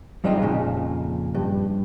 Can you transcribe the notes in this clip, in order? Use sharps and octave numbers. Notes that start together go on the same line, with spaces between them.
F#2 G3 G#3 C4 D#4 F4
F2 A#2 C#3
G2